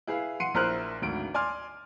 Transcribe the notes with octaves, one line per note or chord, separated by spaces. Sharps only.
E4 G#4 B4 F5
F#5 C6 C7 C#7 D#7
A#1 E4 A#4 C5 F6 F#6
G#1 D2 D7
D5 G#5 C6 F6